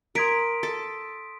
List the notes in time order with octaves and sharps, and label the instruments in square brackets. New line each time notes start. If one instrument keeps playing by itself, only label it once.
[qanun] A#4 [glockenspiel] C6 D#6 G#6 B6 D7
[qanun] A4